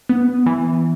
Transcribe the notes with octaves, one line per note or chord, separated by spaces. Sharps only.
B3
E3